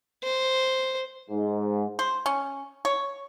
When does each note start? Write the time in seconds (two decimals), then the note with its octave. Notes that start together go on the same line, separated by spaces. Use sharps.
0.24 C5
1.30 G#2
1.99 C5
2.26 C#4
2.85 C#5